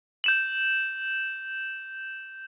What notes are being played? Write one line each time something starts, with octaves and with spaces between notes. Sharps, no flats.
G6 E7 F#7